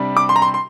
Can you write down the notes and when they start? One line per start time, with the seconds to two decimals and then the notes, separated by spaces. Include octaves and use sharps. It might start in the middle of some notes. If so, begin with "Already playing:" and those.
Already playing: C3 G3 D4
0.17 D6
0.29 C6
0.36 A#5
0.42 C6
0.54 C6